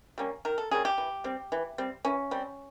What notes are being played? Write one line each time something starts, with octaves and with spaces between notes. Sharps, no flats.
G3 A#3 C#4
D#3 A#4
A4
G3 A#3 C#4 G#4
G4
E3
G3 C4
E3
G3 C4
E3 C#4
G3 C4